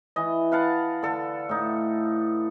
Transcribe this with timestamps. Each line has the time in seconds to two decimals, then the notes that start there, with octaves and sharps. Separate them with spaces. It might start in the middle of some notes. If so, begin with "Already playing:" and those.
0.16 E3 D#5
0.52 B4 F5 F#5 A5
1.03 D3 A4
1.49 A2 D#4